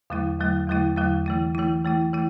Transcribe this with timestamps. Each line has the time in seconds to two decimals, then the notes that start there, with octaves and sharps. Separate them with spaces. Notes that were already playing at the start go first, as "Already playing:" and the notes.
0.10 E2 D3 F#3 A3 E4
0.39 E2 D3 F#3 A3 E4
0.67 E2 D3 F#3 A3 E4
0.97 E2 D3 F#3 A3 E4
1.26 E3 A3 E4
1.55 E3 A3 E4
1.84 E3 A3 E4
2.13 E3 A3 E4